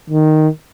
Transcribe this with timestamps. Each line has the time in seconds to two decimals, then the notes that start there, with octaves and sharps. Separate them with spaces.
0.10 D#3